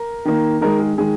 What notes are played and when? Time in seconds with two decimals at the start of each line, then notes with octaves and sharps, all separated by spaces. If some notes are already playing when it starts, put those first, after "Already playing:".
Already playing: A#4
0.25 D#3 A#3
0.61 D#3 G#3 A#4
0.79 G#4
0.98 D#3 G#3 G#4